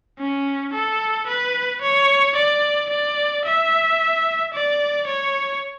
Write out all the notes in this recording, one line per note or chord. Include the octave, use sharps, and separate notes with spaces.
C#4
A4
B4
C#5
D5
D5
E5
D5
C#5